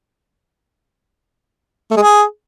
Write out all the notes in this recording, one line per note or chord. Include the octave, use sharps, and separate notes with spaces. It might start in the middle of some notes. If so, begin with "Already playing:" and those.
A3
G#3
G#4